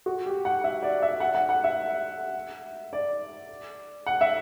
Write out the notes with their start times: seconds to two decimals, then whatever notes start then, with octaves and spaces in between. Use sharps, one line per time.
0.06 F#4
0.26 G4
0.45 F#5
0.64 E5
0.83 D5
1.02 E5
1.20 F#5
1.35 F#5
1.49 F#5
1.64 E5
2.93 D5
4.06 F#5
4.21 E5